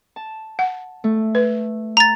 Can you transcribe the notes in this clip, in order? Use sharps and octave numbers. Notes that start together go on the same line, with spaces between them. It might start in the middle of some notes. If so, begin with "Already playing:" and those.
A5
F#5
A3
B4
A#5 A6